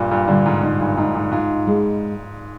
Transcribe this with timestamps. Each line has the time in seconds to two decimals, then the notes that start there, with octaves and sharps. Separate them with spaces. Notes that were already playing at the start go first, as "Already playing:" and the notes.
Already playing: G2 A#2
0.11 G2 A#2
0.27 A#2 D3 G3
0.46 G#2
0.63 G#2 D#4
0.80 G2 A#2
0.97 G#2 D#4
1.15 G#2
1.32 G#2 F4
1.67 G#3